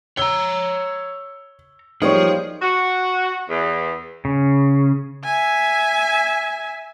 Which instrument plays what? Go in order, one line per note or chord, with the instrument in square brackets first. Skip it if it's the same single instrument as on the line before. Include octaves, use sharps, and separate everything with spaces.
[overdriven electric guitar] C#5 A#5 [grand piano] E6 G7
[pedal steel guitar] F3 [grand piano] G3 A#3 G#6 [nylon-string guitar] D#4 C5 C#5 [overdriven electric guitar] G#4
[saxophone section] F#4
E2
[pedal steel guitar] C#3
[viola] E5 G#5